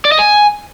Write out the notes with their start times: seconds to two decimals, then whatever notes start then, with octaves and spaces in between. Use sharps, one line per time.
0.05 D5
0.12 D#5
0.19 G#5